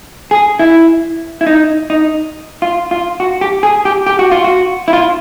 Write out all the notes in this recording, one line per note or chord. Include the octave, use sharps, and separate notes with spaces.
G#4
E4
E4
D#4
D#4
F4
F4
F#4
G4
G#4
G4
G4
F#4
F4
F#4
E4
F4